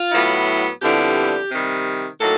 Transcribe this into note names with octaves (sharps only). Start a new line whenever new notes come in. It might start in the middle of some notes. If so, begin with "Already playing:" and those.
Already playing: F4
A2 F#3 B3 E4
F2 D3 G3 B3 E4 G4
C3 D#3 G3
A2 F#3 A#3 D#4 A4